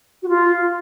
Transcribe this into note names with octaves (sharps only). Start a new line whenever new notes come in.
F#4
F4